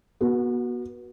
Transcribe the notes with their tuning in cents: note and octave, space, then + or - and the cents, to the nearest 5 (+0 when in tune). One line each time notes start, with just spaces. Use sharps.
B3 -35 F#4 +0